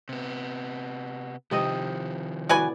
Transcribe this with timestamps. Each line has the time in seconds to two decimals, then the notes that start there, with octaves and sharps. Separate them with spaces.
0.09 C3 B3
1.51 C3 D#3 F3 C4 D#5
2.49 A2 F#4 B4 D5 F#5 G#5